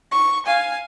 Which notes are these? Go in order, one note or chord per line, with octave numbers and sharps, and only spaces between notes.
C#6
F5 G#5